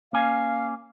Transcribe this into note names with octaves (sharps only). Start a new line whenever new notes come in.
A#3 C#4 F5 G#5